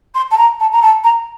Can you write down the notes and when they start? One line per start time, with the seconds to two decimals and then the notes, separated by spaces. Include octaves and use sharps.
0.14 C6
0.31 A5
0.37 A#5
0.59 A5
0.72 A#5
0.81 A5
1.03 A#5